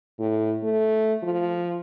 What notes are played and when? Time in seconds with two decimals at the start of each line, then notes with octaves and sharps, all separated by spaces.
0.20 A2
0.64 A3
1.23 F3